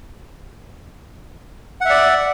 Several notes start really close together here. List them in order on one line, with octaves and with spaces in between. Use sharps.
F#5 E5 D5